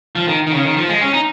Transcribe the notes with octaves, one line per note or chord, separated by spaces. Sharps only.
F3
D#3
D#3
C#3
D#3
F3
G#3
C#4
D#4